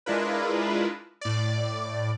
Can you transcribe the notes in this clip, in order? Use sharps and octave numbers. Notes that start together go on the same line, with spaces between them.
G#3 D4 E4 F4 A#4 B4
A2 D5